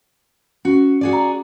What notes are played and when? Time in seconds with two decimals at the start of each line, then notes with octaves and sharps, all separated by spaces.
0.65 C#4 F#4
1.01 F#4 G#4 D5
1.13 A#5